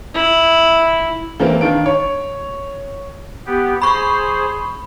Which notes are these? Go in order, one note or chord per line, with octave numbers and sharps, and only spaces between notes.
E4
E3 A#3 C4
D#3 D4 F5 D7
C#5
B3 G4
G#4 C5 B5 C#6